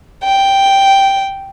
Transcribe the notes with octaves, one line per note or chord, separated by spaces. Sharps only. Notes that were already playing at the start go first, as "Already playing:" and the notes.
G5